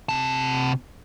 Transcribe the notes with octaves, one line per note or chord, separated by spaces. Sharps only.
C3 A5